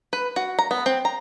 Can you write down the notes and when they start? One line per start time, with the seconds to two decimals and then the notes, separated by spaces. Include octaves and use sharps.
0.13 B4
0.36 F#4
0.59 A#5
0.71 B3
0.86 C4
1.05 A#5